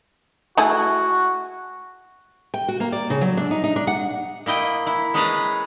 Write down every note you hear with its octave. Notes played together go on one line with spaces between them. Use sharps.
A3 E4 F#4 G#4
G5
F#4
A#3
D5
C#3
F#3
D4
D#4
D#4
D4
F#5
A#3 E4 D#5 G5
E4
G#3 C#4 G#4 B4 A5 A#5